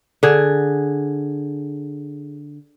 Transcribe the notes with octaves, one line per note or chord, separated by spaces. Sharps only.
D3 G#4